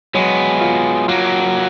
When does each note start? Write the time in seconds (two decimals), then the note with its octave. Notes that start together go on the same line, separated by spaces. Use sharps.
0.14 F#3 G#3 B3
0.61 F4
1.08 F#3 A#3 F4